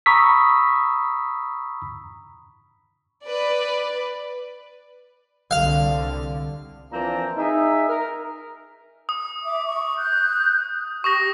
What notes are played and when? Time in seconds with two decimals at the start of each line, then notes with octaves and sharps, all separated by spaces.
0.06 A#5 B5 C#6 D#6 E6 B6
3.26 B4 D5
5.51 C2 D3 F5
6.92 E3 F3 A#3 C4 D4 A#5
7.37 D#4 G#4 E5
7.89 A#4
9.09 D#6
9.43 E5 D6
9.65 C#6
9.98 F#6 G6
11.04 G4 C#6 D#6 A#6